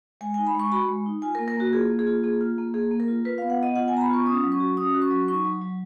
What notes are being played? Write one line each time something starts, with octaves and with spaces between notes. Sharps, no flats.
G#3 G#5
G#5
D#4
B5
G#3 C#6
F#4 B5
G#3
D#4
F4 G#5
A#4
A#3
A#4
A#3 F#4
F4 G#4
A#3
G#4
F4
A#3 G#4
F4
A#3
A#3 G#4
A#3
A#4
F4
F4 B4
F5
B3
F#5
B3 D#5
F4 F#5
G#5
B3 A#5
B5
F4 C#6
C#4 D#6
F#3
C#6
F#4
C#4 D#6
F#4
C#6
F#3
D#4 C#6
F#3
F#3